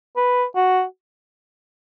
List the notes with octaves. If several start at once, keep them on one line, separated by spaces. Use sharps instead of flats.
B4
F#4